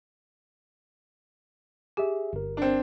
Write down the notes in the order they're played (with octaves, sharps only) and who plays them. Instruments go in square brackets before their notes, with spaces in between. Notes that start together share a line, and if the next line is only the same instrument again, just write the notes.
[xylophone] G4 [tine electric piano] G#4 E5
[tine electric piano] G1 A#4
[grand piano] C4 D4